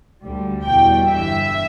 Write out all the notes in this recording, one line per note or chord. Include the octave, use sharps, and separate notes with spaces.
D2 D3 G3
E2 B2 G3 G5
G1 G2 E3 E5